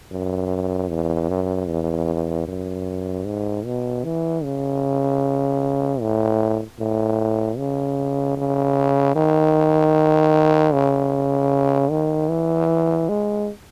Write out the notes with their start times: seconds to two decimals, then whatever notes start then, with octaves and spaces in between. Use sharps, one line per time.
0.11 F#2
0.90 E2
1.30 F#2
1.68 E2
2.47 F#2
3.26 G#2
3.65 B2
4.04 E3
4.44 C#3
6.01 A2
6.80 A2
7.58 C#3
8.37 C#3
9.16 D#3
10.73 C#3
11.91 D#3
12.30 E3
13.09 G#3